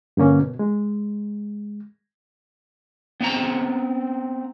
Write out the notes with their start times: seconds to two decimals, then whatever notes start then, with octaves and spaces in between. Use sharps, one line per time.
0.17 G2 D3 A#3 C#4
0.39 B2
0.59 G#3
3.21 B3 C4 A#5